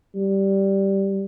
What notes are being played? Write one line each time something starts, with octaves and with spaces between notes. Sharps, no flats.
G3